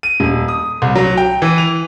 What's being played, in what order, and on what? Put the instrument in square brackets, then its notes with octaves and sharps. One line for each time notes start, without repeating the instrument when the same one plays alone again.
[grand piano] D#7
D#1
D#6
C2
F#3
G5
E3
F7